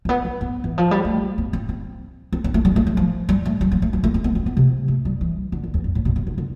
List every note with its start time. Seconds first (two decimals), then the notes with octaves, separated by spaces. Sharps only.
0.05 A3
0.09 B3
0.25 B3
0.41 B3
0.64 E3
0.78 F3
0.91 G3
1.05 A3
1.38 B3
1.53 C4
1.69 C4
2.33 C4
2.44 C4
2.54 A3
2.65 G3
2.76 A3
2.87 A3
2.97 F3
3.29 G3
3.46 A3
3.61 G3
3.72 F3
3.82 A3
3.93 G3
4.04 A3
4.14 C4
4.24 B3
4.35 C4
4.46 B3
4.57 C3
4.88 A3
5.05 G3
5.21 E3
5.52 D3
5.63 E2
5.74 E2
5.84 G2
5.95 A2
6.05 B2
6.16 C3
6.27 D3
6.38 D3